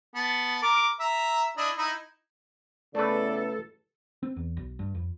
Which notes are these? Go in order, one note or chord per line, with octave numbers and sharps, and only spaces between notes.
B3 A5
A#4 D6
E5 A#5
D4 E4 D#5
D#4 E4 D#5
C#3 A3 B3 E4 A4 B4 D5
C4
E2
B1
G2
F2